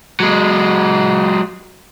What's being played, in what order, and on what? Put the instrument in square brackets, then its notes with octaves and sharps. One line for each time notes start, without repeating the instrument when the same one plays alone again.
[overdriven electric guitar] F#3 G#3